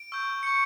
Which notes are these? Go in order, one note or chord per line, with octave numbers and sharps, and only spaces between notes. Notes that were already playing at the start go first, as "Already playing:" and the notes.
Already playing: D7
C#6 E6 G6
C#6 E6 G6 C#7